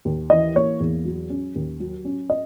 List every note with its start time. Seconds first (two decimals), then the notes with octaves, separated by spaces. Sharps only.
0.05 D#2
0.30 E3 D#5
0.55 A#3 C#5
0.80 E2
1.05 F#3
1.30 C#4
1.55 D#2
1.80 F#3
2.05 C#4
2.30 D#5